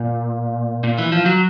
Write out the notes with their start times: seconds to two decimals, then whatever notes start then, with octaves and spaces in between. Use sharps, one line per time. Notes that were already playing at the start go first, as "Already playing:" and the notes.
Already playing: A#2
0.84 A#2
0.98 E3
1.12 F3
1.26 F#3